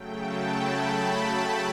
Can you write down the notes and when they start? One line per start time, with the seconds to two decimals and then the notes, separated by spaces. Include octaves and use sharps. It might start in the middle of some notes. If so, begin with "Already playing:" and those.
Already playing: C#3 F#3 A3 G5
0.18 A5
0.47 B5
0.76 A5